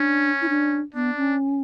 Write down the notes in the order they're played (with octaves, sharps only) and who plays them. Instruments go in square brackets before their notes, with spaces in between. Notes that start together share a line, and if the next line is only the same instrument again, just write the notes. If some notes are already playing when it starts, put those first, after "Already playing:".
Already playing: [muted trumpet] C#4 [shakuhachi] D4
[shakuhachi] E4
D4
[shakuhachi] B3 [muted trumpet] D4
[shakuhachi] C#4